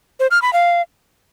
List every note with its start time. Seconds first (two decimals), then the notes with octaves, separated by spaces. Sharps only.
0.20 C5
0.31 F6
0.42 B5
0.53 F5